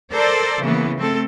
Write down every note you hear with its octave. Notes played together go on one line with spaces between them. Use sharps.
A4 A#4 C5 D5
C#3 E3 A#3 B3
A3 C4 A4